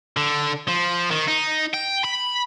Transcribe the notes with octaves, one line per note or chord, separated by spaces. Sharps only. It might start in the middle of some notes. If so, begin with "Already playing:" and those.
D3
F3
D#3
D#4
G5
B5